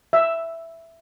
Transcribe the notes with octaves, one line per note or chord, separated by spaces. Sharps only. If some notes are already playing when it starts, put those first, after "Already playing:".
E5